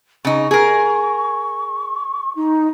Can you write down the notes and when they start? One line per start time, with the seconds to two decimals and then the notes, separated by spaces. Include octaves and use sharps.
0.25 C#3 D#4 C#6
0.51 G#4 A#4
2.36 D#4